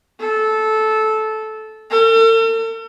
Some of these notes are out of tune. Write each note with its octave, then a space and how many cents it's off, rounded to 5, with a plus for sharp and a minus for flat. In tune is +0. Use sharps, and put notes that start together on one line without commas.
A4 -15
A4 +45